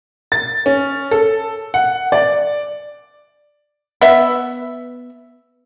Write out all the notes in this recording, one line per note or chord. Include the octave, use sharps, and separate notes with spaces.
A6
C#4
A4
F#5
D5
B3 E5